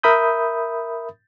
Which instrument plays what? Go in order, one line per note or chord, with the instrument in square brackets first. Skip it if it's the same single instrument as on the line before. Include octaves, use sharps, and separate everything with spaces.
[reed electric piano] A#4 E5 B5 D#6 G6